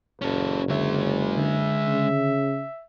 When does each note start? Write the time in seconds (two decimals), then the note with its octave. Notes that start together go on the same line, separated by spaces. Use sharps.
0.22 F#1 C#4 A4
0.69 D3 G#3 C#5 E5
1.37 D3 E5
1.87 C#3